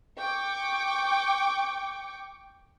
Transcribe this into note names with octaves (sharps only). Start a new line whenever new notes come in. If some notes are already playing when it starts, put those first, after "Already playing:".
G5 C#6 D6